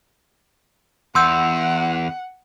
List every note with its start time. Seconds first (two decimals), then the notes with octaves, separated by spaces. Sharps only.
1.15 E2 F#5 C6 E6 G6